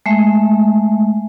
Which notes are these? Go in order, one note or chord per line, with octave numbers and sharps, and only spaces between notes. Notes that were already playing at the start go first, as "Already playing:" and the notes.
G#3 A3 E5